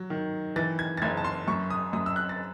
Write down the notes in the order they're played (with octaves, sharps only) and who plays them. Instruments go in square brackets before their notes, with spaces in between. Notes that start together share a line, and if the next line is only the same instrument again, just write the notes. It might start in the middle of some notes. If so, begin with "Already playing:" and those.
Already playing: [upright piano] F#3
D#3
E3 A6
G#6
A6
F#1 G#6
A5
C6
F#2 C#6
D#6
F#2 D#6
E6
F#6
A6